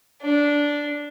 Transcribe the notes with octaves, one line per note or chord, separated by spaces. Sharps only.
D4